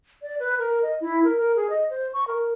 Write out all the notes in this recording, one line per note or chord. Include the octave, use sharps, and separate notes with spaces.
D5
B4
A#4
D#5
E4
A#4
A#4
G#4
D#5
C5
C#6
A#4